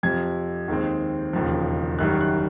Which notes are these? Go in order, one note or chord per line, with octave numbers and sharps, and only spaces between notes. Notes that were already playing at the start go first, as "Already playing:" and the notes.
F2 C3 F3 G#6
D#2 D#3 G#3 C4
E1 D#2 C#3 F3
F#1 F#2 D#3 G3 F#6
F#6